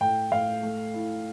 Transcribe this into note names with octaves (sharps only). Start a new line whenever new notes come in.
A2 G5
A2 F5
A3
E4